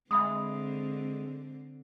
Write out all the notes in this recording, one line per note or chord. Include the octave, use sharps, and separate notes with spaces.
D3 G#3 C4 E5 B5 D#6